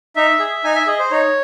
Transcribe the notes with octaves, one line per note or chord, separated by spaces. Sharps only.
D#4 E5
G#4
D#4 G#5
E5
G#4 D#5
C5
D#4 C#5